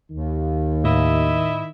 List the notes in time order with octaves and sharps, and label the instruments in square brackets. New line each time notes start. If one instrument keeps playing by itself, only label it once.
[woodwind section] D#2 [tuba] D#3
[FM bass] A2 [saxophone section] E4 D#5 E5